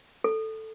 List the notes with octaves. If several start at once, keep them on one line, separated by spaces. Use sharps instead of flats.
A4